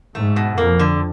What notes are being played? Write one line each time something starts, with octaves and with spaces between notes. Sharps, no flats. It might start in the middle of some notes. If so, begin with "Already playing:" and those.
G#2 A3
B2
F2 A#3
D3